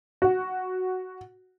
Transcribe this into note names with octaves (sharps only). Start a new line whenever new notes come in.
F#4